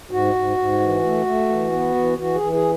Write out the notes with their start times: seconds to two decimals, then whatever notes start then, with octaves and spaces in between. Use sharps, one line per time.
0.11 G#2 F#4
0.35 G#2
0.57 G#2
0.80 E3
1.03 A3
1.26 A3
1.49 E3
1.72 B3
1.95 E3
2.17 E3 F#4
2.35 G#4
2.41 E3
2.52 G#4